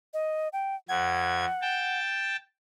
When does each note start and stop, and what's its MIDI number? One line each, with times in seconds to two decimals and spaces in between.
0.14 0.48 75
0.53 0.75 79
0.89 1.45 41
0.89 1.99 78
0.89 1.45 92
1.61 2.36 79
1.61 2.36 81